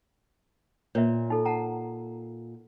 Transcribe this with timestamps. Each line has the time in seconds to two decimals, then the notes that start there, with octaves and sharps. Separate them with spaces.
0.95 A#2 C#5 E5
1.30 D#4 A4
1.45 F#5 A5 A#5